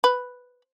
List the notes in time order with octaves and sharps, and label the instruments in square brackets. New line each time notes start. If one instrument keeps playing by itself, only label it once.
[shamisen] B4